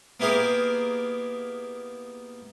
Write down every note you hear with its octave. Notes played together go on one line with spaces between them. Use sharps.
A#3 B3 E4 G4 G#4 A#4